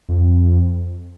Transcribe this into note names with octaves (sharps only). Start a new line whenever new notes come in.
F2